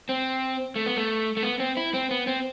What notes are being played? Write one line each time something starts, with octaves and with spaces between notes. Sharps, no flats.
C4
A3
B3
A3
A3
B3
C4
E4
C4
B3
C4